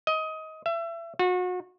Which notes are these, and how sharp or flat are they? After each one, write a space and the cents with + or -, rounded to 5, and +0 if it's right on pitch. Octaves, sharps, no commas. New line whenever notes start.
D#5 +20
E5 +30
F#4 -35